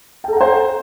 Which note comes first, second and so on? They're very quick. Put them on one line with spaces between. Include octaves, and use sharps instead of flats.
G5 A4 A#5 F#5 C5